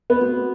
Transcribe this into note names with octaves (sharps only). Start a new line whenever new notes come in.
B3
A3 C4 F#4